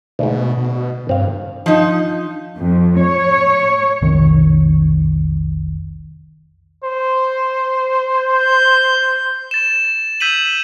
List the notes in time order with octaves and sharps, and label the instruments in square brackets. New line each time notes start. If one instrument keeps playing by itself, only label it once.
[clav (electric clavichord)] D2 G#2 [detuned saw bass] B2
[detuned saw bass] B2
[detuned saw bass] G2 [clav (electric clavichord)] C4 F5
[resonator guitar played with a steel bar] F3 D#4
[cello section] F2
C#5
[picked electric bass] F1 B1 D#3
[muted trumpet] C5
[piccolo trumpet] G6
[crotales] A6 E7
E6 G6 B6 D#7 F#7